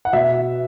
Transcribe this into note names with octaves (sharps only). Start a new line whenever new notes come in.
F#5
B2 E5